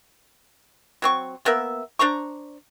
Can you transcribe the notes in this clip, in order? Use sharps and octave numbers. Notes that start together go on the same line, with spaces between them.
F#3 C4 C#6
A#3 B3 A#4 E5
D4 C5 A#5 C#6